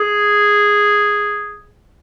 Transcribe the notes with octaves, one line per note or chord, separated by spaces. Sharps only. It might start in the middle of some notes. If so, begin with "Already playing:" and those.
Already playing: G#4